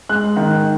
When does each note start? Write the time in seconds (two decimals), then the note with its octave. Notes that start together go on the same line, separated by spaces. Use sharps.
0.09 G#3 F#6
0.37 D#3